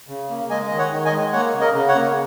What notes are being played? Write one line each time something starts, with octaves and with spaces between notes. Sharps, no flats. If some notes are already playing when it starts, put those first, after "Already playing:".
C#3
A#3
G#3 D#5 G#5
D#3 D#5
C#5 F#5
D#3
D#5 G#5
G#3
A#3 C#5 F#5
C#3
A#4 D#5
C#3
C#5 F#5
A#3